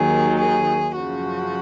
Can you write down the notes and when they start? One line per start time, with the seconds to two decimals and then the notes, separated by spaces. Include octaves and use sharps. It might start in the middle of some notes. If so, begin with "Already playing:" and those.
Already playing: D#2 D#3 F#3 G#4
0.39 G#4
0.97 F#2 C#3 F3 F#4